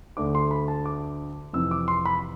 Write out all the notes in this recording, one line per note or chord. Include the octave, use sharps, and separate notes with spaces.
D2 D3 A3 D6
C6
B5
A5
D6
F2 C3 E3 E6
D6
C6
B5